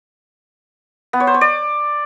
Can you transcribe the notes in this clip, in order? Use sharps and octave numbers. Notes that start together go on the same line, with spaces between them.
B3
C#5
C5
C#5
D5